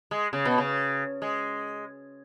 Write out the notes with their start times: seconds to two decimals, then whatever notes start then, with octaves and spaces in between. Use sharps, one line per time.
0.11 G#3
0.33 C#3
0.45 B2
0.58 C#3
1.22 G#3